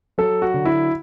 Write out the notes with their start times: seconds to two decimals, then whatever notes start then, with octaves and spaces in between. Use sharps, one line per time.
0.18 F#3 A4
0.42 F#4
0.54 D3
0.65 E4